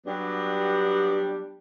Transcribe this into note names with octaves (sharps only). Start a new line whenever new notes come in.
F#3 G3 B3 D4 G4